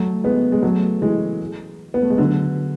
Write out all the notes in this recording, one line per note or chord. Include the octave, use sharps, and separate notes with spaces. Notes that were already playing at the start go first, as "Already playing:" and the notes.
Already playing: F#3 A3
G#3 B3
G#3
F#3 A3
E3 G#3
B3
A3
G#3
D3 F#3